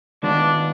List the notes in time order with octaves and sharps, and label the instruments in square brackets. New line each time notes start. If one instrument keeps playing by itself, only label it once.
[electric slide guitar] D#3 G#3 B3 F4 [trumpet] D4